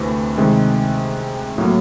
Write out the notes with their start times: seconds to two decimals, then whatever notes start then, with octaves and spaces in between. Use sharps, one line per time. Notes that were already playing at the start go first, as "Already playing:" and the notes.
Already playing: D2 C3 E3 A3
0.37 C3 D#3 G#3
1.58 A2 F#3 A#3